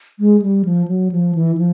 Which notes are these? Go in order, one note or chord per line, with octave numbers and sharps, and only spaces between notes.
G#3
G3
F3
F#3
F3
E3
F3